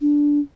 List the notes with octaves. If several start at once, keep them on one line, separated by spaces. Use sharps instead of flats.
D4